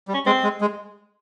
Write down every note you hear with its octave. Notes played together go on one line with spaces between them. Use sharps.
G3
C#4
G#3 C4
G#3
G#3